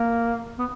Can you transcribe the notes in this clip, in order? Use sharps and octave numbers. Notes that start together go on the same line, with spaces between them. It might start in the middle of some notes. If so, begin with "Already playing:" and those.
Already playing: A#3
B3